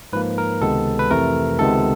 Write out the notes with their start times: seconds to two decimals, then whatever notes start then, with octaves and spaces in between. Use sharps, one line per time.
0.13 G#2 F3 A#3 B4
0.38 A#4
0.62 C#2 C3 D#3 G#3 B3 A4
0.99 B4
1.10 F2 C3 E3 A3 A#4
1.59 C#2 C3 D#3 G#3 B3 A4